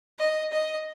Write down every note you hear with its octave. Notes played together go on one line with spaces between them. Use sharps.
D#5
D#5